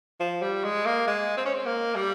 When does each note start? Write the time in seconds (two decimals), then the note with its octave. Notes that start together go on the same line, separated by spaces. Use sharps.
0.20 F3
0.42 G3
0.64 G#3
0.86 A#3
1.07 G#3
1.37 C4
1.45 C#4
1.54 C4
1.66 A#3
1.95 G3